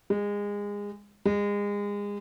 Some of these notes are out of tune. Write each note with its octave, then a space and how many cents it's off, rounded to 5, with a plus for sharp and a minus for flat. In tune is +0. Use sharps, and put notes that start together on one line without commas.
G#3 -25
G#3 -30